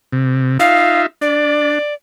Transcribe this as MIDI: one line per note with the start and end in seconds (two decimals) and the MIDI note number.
0.12 0.58 48
0.59 1.06 63
0.59 1.06 65
0.59 1.06 76
0.59 1.02 77
1.21 1.79 62
1.21 1.94 74